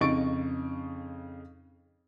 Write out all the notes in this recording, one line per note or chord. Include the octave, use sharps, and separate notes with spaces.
F2 C#3 D#4 C#6 A6 D7